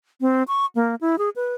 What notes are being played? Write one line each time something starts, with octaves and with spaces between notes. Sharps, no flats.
C4
C#6
A#3
E4
G#4
B4